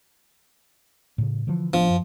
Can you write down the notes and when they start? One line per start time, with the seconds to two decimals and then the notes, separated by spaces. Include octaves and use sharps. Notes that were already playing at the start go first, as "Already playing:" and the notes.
1.18 A2 C#3
1.47 D3 E3 F3
1.74 A1 F3 B3 D4
1.90 F#2